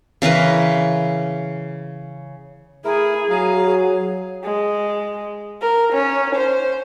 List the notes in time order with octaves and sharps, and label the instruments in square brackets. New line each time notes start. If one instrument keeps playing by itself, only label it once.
[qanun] C#3 E3 A#4 B4
[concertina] A3 E4 A#4 [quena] G#4
[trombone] F#3 [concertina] F5 A#5
[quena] G#4
[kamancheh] G#3
A#4
C#4
C5